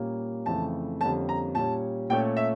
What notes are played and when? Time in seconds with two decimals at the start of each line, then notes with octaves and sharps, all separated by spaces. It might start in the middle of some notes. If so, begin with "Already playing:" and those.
Already playing: A#2 G3 A#3 C#4
0.46 F2 C#3 E3 A3 A5
1.01 F2 D3 G3 A#3 C#4 A5
1.29 A#5
1.55 A#2 G3 C#4 A5
2.10 A#2 A3 C#4 G5
2.37 E5